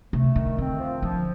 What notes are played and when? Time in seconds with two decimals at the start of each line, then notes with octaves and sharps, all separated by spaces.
0.13 C3 A3
0.36 D3 D#3
0.58 D3 C4
0.79 F3
1.02 D3 F3